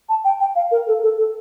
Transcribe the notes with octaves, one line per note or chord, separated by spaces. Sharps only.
A5
G5
G5
F5
A#4
A4
A4
A4